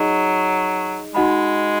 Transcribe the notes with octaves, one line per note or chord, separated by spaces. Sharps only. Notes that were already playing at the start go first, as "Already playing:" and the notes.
Already playing: F#3 D#4 G#4 D#5
G#3 D#4 F#4 D#5 F#5 B5